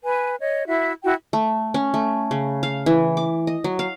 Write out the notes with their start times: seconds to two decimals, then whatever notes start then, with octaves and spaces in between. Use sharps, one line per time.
0.03 B4 G#5
0.39 C#5 D#5
0.67 E4 F#4 E5
1.03 E4 F#4 G5
1.33 A3
1.74 C#4
1.94 A3
2.31 C#3
2.63 F5
2.86 E3
3.17 D6
3.47 D#5
3.64 F#3
3.79 F5